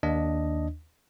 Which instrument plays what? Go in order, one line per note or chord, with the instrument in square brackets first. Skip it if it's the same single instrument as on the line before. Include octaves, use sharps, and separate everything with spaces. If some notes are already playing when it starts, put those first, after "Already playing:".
[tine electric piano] D#2 D4 D#5